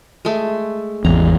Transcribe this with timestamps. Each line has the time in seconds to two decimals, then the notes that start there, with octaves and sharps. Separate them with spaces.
0.25 G#3 A3
1.05 G#1 E2 A#5